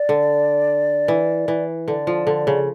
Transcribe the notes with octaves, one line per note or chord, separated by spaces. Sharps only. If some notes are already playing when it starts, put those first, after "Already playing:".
Already playing: D5
D3
E3
E3
D3 D5
F3
D3
C#3